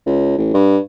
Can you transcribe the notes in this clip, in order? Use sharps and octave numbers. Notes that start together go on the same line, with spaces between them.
C#2
A1
G2